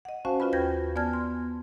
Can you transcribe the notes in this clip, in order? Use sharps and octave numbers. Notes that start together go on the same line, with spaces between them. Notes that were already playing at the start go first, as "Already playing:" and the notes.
D#5 F#5
C#4 F#4 C5 F5 G#5 A5
C#4 F4 F#4 B4 B5
D#2 B4 G5 G6 G#6 A#6
B3 D5 G#5 A5 F6 G#6
C6